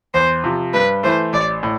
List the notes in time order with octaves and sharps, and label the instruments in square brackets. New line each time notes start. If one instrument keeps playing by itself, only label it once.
[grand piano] E2 [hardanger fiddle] C5
[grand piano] C3 F3
[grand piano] G2 [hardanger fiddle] B4
[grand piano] E3 A3 [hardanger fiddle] C5
[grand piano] A1 [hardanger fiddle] D5
[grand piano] A2